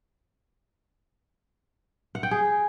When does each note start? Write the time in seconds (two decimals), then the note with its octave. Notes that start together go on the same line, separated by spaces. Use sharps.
2.15 F#5
2.23 G5
2.31 G#4